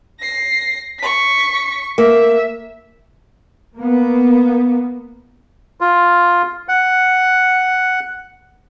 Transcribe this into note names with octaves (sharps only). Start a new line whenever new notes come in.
A#6 C7
C#6 B6
A#3 E5
A#3 B3
F4
F#5